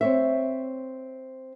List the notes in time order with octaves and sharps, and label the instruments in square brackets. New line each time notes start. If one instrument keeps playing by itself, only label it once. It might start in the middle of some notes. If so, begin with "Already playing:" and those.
[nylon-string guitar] C4 C#5 E5